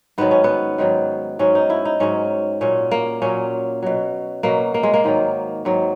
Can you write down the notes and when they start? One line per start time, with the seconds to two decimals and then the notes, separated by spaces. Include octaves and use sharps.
0.18 G#2 D#3 F#3 B3
0.31 C#4
0.44 B3
0.78 G#2 D#3 F#3
1.39 G#2 F#3 C#4
1.55 D#4
1.70 E4
1.85 D#4
2.00 G#2 F#3 C#4
2.61 A#2 F#3 C#4
2.91 A#3
3.22 A#2 F#3 C#4
3.82 B2 F#3
4.43 B2 F#3 A#3
4.74 A#3
4.83 G#3
4.94 A#3
5.04 G#2 D#3 F#3
5.65 G#2 D#3 F#3